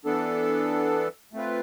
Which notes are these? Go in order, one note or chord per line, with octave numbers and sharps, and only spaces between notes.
E3 B3 D4 A4
A3 C4 F4 B4